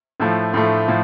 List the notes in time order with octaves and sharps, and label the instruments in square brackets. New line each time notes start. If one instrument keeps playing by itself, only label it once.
[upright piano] A2 F3 A3
A2 F3 A3
A2 F3